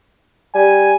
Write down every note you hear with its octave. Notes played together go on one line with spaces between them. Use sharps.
G3 G#5